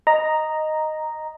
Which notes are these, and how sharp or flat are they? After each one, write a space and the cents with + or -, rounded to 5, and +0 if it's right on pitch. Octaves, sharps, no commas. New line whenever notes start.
D#5 -5 A#5 +0